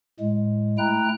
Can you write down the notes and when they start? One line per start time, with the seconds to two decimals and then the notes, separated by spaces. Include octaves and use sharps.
0.20 A2 G#3
0.78 A3 E4 G5 A#5 F#6